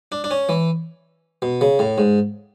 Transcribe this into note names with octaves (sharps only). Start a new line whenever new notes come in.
D4
D4
C#4
E3
B2
C#3
A2
G#2